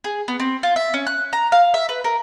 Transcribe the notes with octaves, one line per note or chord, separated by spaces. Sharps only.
G#4
B3
C4
F4
E5
C#4
F#6
A#5
F5
E5
B4
A#4